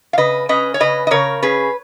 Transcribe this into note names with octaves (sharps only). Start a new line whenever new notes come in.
F5
C#3 B4 D#5
C#4 B4 D#5
C#5
C#3 B4 D#5
D#5
C#3 A#4 C#5
C#4 G#4 B4